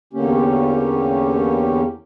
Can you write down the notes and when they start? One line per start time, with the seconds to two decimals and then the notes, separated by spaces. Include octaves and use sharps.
0.13 E2 D3 A#3 C#4 G4